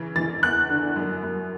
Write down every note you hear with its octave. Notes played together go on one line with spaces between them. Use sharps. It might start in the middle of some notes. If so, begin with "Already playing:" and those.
Already playing: C#3 E3
E3 A6
E2 F#6
D3
F#2
F#2